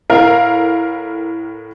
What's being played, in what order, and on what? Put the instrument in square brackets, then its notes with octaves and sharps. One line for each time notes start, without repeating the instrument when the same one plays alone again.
[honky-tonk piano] A2 A#4 F5